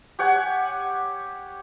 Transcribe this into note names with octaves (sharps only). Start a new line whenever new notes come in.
G4 C#5 F#5 G#5